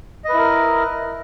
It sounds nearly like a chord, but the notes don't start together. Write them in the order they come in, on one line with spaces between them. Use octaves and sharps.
D#5 B4 E4 A#4